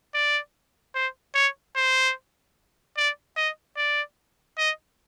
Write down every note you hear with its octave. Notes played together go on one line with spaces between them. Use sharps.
D5
C5
C#5
C5
D5
D#5
D5
D#5